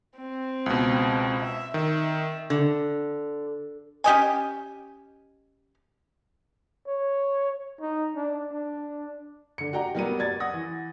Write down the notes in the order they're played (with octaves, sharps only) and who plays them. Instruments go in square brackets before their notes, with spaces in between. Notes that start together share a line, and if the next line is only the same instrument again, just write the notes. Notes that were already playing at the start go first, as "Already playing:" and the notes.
[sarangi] C4
[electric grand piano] C#2 B2
[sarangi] E5
[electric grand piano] D#3 [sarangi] E5
[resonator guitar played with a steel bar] D3
[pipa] C#4 G4 D#5 G#5
[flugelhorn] C#5
D#4
D4
D4
[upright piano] D3 C#7
F#4 G4 D5 G5 A#5
F#3 G3 A#3 B3 F#4 D#7
D5 G#6 A6
F#5 D#6 A#6
E3